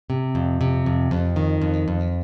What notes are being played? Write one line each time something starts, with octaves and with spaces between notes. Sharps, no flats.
C3
F2
C3
F2
F2
D#3
F2
F2